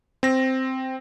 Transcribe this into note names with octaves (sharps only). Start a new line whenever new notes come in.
C4 A#6